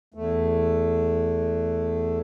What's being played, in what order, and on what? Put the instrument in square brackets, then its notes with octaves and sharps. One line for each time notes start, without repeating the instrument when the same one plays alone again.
[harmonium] E2 A3